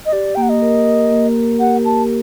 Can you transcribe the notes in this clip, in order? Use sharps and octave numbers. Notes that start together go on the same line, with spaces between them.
D#5
G4 D5
A#3 G5
F#5
D#5
A#4
A#4
A#3
A#4
G4 F#5
G4 A5